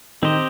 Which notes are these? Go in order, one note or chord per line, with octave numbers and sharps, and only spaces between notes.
D#3 C4 G4 C5 D#5